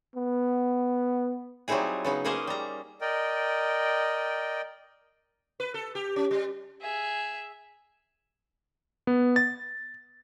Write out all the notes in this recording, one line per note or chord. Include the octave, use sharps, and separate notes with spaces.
B3
F#3 G3 C4 D#4 E4 G#4
C#3 B3 D#4
A#3 C#4 G#4 C5 D#5
G3 A#5
A#4 D5 D#5 G5
B4
A4
G4
C#4
G3
G#4 E5
B3
A6